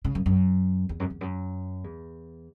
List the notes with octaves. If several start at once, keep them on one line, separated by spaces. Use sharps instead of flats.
C#3
F#2
F#2
E2
F#2
E2
F#2
E2